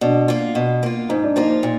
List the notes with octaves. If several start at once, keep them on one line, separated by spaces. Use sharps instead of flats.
B2 D4
A#3 F4
B2
A#3 F4
G#2 D#4
D4
F3 A#3 D#4 F4
A#2